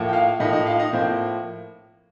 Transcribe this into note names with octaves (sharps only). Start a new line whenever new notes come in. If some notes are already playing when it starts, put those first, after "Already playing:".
Already playing: A2 F3 A#3
G5
F4 F5
A2 F3 A#3 D#4 D#5
D#4 D#5
F4 F5
D#4 D#5
A2 F3 A#3 C4 C5